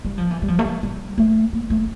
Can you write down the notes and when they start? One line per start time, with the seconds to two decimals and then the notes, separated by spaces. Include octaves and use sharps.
0.05 G3
0.18 F3
0.31 E3
0.42 G3
0.48 F3
0.59 A3
0.65 G3
0.83 G3
1.18 A3
1.53 A#3
1.70 A3